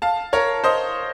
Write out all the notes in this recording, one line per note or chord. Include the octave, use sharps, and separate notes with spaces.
F5 A5
A#4 C#5
C5 D#5